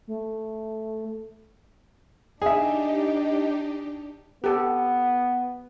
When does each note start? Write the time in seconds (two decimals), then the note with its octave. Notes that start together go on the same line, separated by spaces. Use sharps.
0.08 A3
2.42 D4 D#4 G4 G#4 D#5 E5
4.44 B3 G4 A4